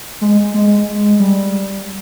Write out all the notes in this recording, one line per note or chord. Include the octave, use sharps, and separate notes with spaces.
G#3
G#3
G3